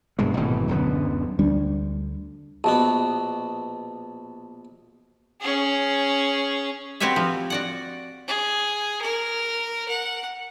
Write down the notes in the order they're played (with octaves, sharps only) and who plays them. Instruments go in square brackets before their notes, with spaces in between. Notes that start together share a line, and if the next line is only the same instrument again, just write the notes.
[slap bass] E1 G2 B2 G#3
G#1 B2 E3 A3
D1 F#2 D3 B3
[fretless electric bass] D2 G3 D4
[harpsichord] A#1 B2 B3 [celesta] A5
[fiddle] C#4 G#4
[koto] C4 F#4 G4 B4 C#5 E5
F3
F#4 D5 F#5
[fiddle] G#4
A#4
F#5